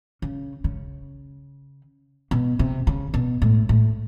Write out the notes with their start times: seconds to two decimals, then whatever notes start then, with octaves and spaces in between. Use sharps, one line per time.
0.22 C#3
0.64 C#3
2.31 B2
2.59 C3
2.87 C#3
3.14 B2
3.42 A2
3.69 A2